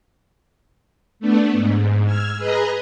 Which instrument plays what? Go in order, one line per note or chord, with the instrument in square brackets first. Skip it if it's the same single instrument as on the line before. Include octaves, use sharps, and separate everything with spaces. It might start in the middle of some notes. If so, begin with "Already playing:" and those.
[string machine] A3 B3 D4
G#2
E6 F6 G#6
G#4 B4 D#5 A#5